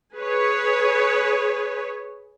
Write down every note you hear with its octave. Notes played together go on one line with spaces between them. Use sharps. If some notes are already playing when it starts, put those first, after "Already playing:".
G#4 B4 C#5